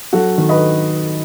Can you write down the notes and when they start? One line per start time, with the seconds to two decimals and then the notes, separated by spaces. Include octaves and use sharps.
0.13 F#3 F#4 A4
0.38 D#3
0.49 B4 D#5